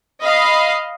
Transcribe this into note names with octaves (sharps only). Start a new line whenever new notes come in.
D#5 F5 B5